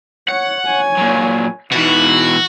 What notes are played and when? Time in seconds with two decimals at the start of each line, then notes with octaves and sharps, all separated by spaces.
0.28 C#5 F#5
0.66 C#5 G#5
0.97 A#2 F#3
1.72 B2 E3 D#4 F#4